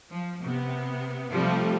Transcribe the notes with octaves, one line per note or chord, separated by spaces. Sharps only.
F3
C3 B3
C3 F3 G3 A3